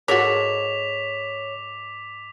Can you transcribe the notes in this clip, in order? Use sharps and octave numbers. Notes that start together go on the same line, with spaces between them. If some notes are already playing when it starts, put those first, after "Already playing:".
G#2 F#4 A4 A#4 C#5 D6 B6 F7